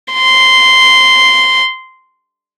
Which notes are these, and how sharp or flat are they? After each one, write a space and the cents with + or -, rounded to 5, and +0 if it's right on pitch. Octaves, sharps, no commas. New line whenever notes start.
C6 -10